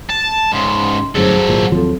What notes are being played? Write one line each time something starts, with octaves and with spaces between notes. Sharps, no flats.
A5
G#2 C#3 C6
G1 F#2 A2 F#3 G#4 A4 C5
G#1 A#2
D#2 F3 F#3 C4 A4